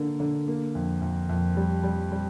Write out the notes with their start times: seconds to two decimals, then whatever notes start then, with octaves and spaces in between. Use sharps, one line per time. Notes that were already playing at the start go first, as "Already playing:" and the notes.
Already playing: D3 A#3
0.20 D3
0.48 A#3
0.75 F2
1.02 F2
1.29 F2
1.57 G3
1.84 G3
2.12 G3